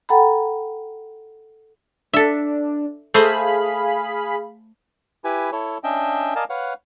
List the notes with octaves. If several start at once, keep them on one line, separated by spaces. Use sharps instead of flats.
A4 F#5 G5 A#5 B5
D4 A4 E5
A3 G#4 C5 D#5 F5 B5
E4 G4 B4 G#5
E4 A4 C#5
C#4 D4 D#5 E5 G5
A#4 D5 D#5 F5 G#5 A5
B4 C#5 F5 F#5